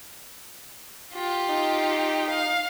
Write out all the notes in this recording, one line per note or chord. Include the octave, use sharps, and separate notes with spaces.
F4 G4
D#4
F5